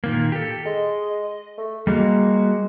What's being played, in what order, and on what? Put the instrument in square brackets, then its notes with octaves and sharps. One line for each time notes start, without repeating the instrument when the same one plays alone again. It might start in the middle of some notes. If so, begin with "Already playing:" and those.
[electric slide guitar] A#2 D#3 A#3
G4 A4
[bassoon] G#3 [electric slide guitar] D#5
[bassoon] A3
[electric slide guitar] G3 A#3 F#4 [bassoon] G#3